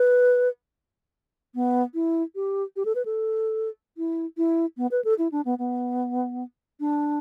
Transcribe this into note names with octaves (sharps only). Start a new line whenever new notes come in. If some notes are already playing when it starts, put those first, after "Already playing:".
Already playing: B4
B3
E4
G4
G4
A4
B4
A4
E4
E4
B3
B4
A4
E4
D4
B3
B3
D4